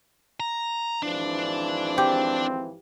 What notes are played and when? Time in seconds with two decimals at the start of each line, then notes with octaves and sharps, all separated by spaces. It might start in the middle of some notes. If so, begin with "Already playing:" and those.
0.40 A#5
1.03 G#1 E3 F3 D4
1.98 C4 G4